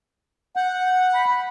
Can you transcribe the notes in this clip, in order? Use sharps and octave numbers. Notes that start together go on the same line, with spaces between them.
F#5 G6
B5